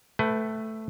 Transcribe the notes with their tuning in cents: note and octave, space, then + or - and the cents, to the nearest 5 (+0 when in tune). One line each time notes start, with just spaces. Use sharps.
A3 +0 B4 +20 G5 +0